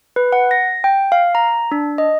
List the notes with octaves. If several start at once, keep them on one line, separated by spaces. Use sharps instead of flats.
B4
F#5
A#6
G5
F5
A#5
D4
D#5